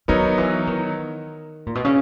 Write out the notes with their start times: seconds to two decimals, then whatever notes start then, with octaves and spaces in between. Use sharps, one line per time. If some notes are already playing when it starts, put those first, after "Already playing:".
0.08 D#3 F#3 B3 D#4 A#4 C#5
0.38 E3
0.67 D#3
1.66 A#2
1.75 B2
1.85 C#3